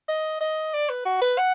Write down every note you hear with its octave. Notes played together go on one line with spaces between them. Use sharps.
D#5
D#5
D5
B4
F#4
B4
F#5